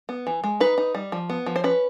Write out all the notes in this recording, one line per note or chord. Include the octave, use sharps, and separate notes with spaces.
B3
E3
G#3
D#4 B4
D#4
G3
F3
B3
F3
C5
C#4 B4